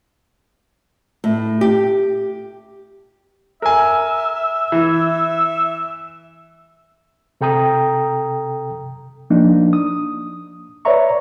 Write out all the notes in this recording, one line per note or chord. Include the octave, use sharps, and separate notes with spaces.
A2
G4
A#4 E5 G#5
E3
C3 A4 G5 A#5 D#6
F3 A#3 D4 D#4
D#6
B4 C#5 D5 E5 A#5 C#6